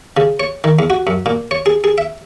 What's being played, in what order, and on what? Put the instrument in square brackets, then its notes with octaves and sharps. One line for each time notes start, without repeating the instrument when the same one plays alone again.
[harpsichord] C#3
C#5
D#3
E2
F#4
F#2
A#2
C#5
G#4
G#4
E5